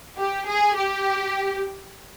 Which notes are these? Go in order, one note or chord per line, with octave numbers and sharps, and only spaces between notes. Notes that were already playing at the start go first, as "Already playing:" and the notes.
G4
G#4
G4